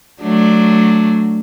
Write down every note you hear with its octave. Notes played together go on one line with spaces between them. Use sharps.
F#3 A3 D4